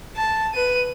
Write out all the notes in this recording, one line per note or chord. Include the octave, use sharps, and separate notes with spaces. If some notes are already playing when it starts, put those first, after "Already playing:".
A5
B4 D#7